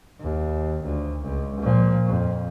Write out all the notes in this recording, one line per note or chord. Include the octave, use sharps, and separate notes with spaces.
D#2
D2
C#2
A#2 F3
F2